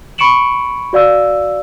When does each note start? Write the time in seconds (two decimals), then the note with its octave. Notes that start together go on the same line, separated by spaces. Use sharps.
0.18 B5 C#6 C#7 D7 E7 F#7
0.93 F#4 D5 F5 E6